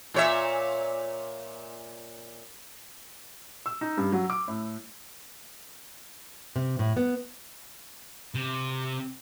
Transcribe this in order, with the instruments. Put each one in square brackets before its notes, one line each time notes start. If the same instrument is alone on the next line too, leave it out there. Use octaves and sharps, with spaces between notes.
[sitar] A#2 C#5 E5
[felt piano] E6
D#4
G2
F#3
D6
A2
[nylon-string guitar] C3
A2
B3
[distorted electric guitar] C3